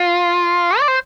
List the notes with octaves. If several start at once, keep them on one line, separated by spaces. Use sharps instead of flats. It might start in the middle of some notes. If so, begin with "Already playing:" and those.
Already playing: F4
D5
C5